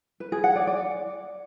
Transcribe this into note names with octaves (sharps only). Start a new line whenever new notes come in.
B4
G#4
F#5
D5
D5